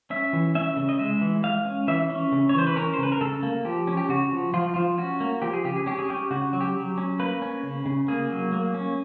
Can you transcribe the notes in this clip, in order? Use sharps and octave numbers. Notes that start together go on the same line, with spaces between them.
C#4 E5
E3
C#4 E5
C#3
D#5
G#3 E5
E3
G#3 F5
C#4
E3 E5
C#4
C#3
C#5
E3 C5
B4
C#4 A#4
C5
C#3 B4
A#4
C#3 A4
A#3
F3 G4
C#4
G4
C#3 F#4
F3
F3 F4
F3 F4
C#4 F#4
A#3
F3 G4
G#4
C#3 G4
G#4
C#4 G4
G#4
C#4 G4
C#3 F#4
F#3
G4
F#3
C#4
A#3 B4
C#4
C#3
C#3
A#3 G#4
F#3
A#3
C#4